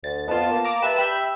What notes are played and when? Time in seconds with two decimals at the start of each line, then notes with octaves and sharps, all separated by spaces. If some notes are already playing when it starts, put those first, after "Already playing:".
0.04 D2 A6
0.28 F2 B3 F4 A5
0.50 A#3
0.65 A#5 D6
0.82 G4 B4 E5 A5 E7
0.98 G4 E5 B5 G6